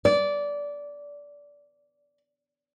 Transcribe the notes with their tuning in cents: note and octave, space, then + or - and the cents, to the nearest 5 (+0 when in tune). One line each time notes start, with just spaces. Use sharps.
D5 -15